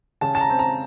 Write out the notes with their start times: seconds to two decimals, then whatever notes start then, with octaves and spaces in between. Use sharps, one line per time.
0.21 C#3 A5
0.35 A5
0.41 A#5
0.50 C4
0.59 A#5